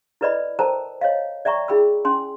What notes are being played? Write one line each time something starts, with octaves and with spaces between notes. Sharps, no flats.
E4 A4 B4 D5 D#5 B5
A4 A#4 C5 G5 A5 A#5
C#5 D#5 F5
D5 E5 G5 A#5 C#6
E4 G#4 G5 B5 E6
C#4 G#5 C6